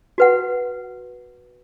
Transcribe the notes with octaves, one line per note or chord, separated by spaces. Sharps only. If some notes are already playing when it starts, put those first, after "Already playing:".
F#4 B4 F#5